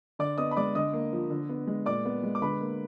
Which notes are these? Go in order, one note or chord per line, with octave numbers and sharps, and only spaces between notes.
D3 D5 D6
B3 D#5 D#6
B5
G#3 D5 D6
D3 D#5 D#6
A#3
F3
D3
B3
G#3
A#2 D5 D6
B3
G#3
D6
D3 B4 B5
A#3